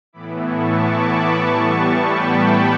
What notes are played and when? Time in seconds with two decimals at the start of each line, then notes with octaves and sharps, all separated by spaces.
0.13 A2 E3 B3 E4 B5 D6
0.44 A5 C#6
0.75 B5 D6
1.07 A5 C#6
1.38 A2 E3 G3 B3 A5 C#6
2.00 G5 B5
2.31 A5 C#6